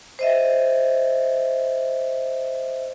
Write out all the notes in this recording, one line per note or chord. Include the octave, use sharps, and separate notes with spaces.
C5 D#5 E5